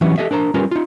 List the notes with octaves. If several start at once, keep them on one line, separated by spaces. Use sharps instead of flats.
E3 F#3 G3 B3 C#4
G4 A4 D#5 E5
D4 A#4 C5 A#5
G3 C#4 F4 A#4 B4
D#4 F4